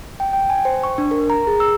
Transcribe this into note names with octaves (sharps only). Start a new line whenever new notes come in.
G5
G5
G#5
C5
C#6
D4
A#4
A#5
G#4
E6